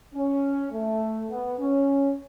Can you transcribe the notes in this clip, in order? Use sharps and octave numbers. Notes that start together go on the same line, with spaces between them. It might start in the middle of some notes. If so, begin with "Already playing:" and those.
C#4
A3
B3
C#4